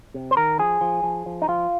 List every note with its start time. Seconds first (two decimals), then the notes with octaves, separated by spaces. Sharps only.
0.14 C3
0.31 C5
0.37 D#3 A#4
0.59 F3 G#4
0.81 F3
1.03 F3
1.26 F3
1.42 D#4
1.48 F3 F4